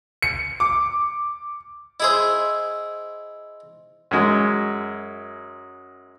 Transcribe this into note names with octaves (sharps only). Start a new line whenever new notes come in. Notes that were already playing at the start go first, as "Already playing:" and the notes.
C#7
D6
E4 G#4 C5 D#5 E6
F#2 G#3